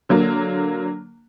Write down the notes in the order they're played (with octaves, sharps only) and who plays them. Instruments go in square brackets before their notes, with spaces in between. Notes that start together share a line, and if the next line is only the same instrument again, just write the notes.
[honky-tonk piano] D3 F#3 A#3